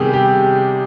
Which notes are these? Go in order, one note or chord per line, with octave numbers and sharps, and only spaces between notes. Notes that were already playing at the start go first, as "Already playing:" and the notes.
Already playing: C3 D#3 G3 B3 G4 G#4
G4